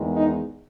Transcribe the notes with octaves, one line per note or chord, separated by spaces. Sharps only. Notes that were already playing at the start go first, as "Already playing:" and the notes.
Already playing: E2 D#3 G#3
D#4